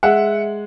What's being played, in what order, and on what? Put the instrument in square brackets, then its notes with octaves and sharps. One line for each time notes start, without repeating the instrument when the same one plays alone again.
[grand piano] G#3 E5 F#5